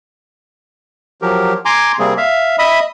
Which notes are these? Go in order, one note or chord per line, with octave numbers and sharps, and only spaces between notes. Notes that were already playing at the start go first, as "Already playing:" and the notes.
F3 F#3 G4 A#4
G#5 A#5 C6 D6
C3 G3 A#3 C4 G#4
E5 F5
D#5 E5 B5 D#6